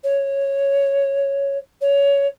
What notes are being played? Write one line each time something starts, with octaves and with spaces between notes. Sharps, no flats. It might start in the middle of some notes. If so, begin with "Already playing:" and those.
C#5
C#5